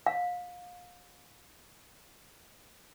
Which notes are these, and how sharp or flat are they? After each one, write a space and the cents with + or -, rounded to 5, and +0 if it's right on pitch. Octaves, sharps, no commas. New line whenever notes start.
F5 +30